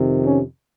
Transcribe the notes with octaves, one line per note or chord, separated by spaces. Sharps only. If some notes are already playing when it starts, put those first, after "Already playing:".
Already playing: F2 C3 D#3
C#4